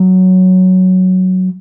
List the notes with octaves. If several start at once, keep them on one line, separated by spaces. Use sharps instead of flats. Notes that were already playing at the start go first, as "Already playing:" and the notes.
Already playing: F#3